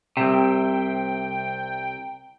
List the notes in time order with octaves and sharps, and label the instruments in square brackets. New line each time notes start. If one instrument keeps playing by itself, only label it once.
[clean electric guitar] C2 C3 [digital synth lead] G5